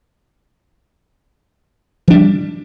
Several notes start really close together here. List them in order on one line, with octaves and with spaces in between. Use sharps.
F3 D4 G3